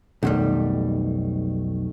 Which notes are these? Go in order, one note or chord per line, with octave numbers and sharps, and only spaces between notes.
B1 F2 D#3 G3 A3